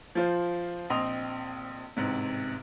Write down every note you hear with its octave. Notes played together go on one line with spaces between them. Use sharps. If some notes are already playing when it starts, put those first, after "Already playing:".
F3 F4 C5
A#1 C4 D#5 C6 D#6 F7
A1 G#2 C3